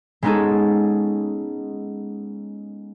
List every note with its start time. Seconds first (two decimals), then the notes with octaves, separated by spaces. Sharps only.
0.23 G#3 B3 C#4 D#4 G#4 A4